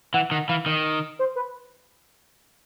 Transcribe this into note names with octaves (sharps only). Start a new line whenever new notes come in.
E3 F#5
D#3 F#5
E3 F5
D#3 D#5
C5
B4